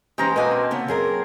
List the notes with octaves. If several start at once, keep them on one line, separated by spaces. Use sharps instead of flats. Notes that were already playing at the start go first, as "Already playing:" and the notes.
E3 G#3 C#4 G4 C5 A#5
B2 A#3 B4 D#5 G#5 A5
C4
C#3 B3
F#2 G#4 A#4